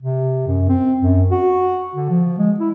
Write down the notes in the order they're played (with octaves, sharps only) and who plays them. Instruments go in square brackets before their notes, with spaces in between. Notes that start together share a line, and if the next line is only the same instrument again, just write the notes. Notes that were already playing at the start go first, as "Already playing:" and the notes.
[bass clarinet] C3
F#2
C4
F#2
F#4
D3
F3
G#3
E4